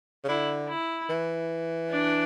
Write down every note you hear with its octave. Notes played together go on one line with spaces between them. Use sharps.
C#3
D3 E4
E4
E3
D4